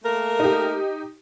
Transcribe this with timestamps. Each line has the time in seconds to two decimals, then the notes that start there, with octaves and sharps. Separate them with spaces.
0.04 A3 A#3 A#4
0.40 D#4 G4